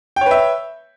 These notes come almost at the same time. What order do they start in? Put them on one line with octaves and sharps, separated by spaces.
G5 C#5 B4 E5